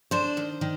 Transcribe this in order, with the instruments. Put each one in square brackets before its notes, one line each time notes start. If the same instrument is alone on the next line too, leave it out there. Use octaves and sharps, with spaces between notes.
[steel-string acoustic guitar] D4 C5
D#3
D#3